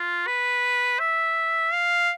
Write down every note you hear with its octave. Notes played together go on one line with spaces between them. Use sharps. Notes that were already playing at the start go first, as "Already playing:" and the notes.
Already playing: F4
B4
E5
F5